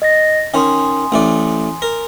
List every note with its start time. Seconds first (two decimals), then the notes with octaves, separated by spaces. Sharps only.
0.02 D#5 A6 A#6
0.54 D#3 C#4 G#5 C6 D#6
1.12 A1 A2 D5
1.82 A#4